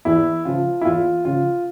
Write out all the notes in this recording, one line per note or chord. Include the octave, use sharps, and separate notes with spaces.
E2 E4
C#3 F3 F4
E4
E2 F4
C#3 F3 F4